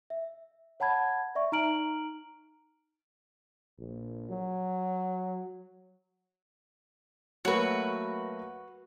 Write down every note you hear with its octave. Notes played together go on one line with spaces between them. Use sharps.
E5
C#5 F#5 A5 B5 G#6
D5 E5 C#6
D#4 A#5 F6 D7 F#7
A#1
F#3
F#3 A3 A#3 F#4 B4